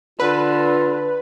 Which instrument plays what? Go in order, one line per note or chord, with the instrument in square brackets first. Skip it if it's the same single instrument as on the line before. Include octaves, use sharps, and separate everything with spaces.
[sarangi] D3 [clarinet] F4 [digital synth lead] B4